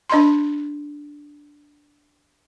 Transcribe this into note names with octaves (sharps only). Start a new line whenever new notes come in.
D4 D#5 B5 C6